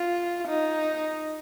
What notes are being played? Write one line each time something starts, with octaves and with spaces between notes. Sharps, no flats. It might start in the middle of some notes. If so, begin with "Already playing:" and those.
Already playing: F4
D#4